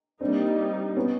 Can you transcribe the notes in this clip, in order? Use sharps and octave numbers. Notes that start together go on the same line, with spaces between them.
G3 A#3 C4 D4 D#4
B3 C#4